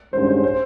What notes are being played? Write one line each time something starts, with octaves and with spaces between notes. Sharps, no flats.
G2 D#3 G#3 C#4 F#4 C5
C5
C5